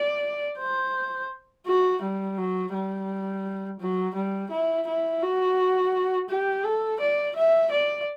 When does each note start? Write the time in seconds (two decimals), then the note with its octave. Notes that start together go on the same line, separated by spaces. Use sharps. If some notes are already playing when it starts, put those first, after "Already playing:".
Already playing: D5
0.59 C5
1.67 F#4
2.02 G3
2.38 F#3
2.73 G3
3.80 F#3
4.15 G3
4.51 E4
4.88 E4
5.23 F#4
6.30 G4
6.65 A4
7.00 D5
7.36 E5
7.72 D5